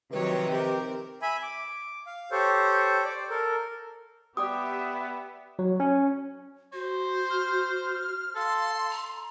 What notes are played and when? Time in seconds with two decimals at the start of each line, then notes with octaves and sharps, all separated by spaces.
0.11 C3 D#3 F3 F#3 B4 C#5
0.49 C4 G4 A#4
1.22 E5 G#5 B5
1.43 D6
2.07 F5
2.32 G4 A4 C5 C#5
3.04 C5 D5
3.30 A4 A#4
4.37 B3 G4 D5 E5 G5 D6 D#6
5.59 F#3
5.80 C#4
6.74 F#4 C5
7.30 F6
8.36 A4 F5 C6
8.91 A#5